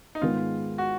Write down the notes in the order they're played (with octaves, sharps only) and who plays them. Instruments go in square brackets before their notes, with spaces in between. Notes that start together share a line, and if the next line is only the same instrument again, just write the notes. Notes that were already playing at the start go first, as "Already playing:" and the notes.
[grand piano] D#4
[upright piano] G#2 D#3 G#3 B3 [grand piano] F4
[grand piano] F#4